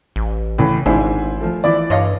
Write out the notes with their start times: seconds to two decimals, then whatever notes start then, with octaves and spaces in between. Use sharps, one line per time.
0.16 A1
0.58 A2 C#3 E3
0.86 G#1 G#2 D4 E4 C5 G#5
1.41 F3 A3
1.64 E3 E4 D5
1.90 G2 C#5 D#5 F5